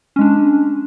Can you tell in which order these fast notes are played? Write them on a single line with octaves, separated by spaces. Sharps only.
C#4 G#3 D4